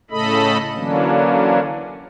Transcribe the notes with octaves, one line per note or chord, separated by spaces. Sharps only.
A2 C#3 A3 A4 D#5 B5
D3 E3 F#3 A#3 C#4 D4